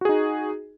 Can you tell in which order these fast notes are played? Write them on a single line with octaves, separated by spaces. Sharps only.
F#4 G#4 D#4